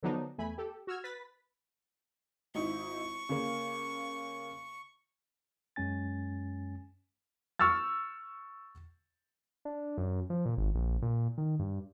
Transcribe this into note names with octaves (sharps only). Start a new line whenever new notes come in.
D3 F3 F#3 B3 D4 D#4
E2 A3 G#5 B5
G4 A4
F#4 E6 F6 G#6
B4 A6 B6
G#1 D#4 E4 C#6
C#3 A#3
F#2 G#3 C#4 G#5 A6
C#6 E6 F6 A6
D4
F#2
F3
A#2
G#1
A#1
A#2
D#3
G2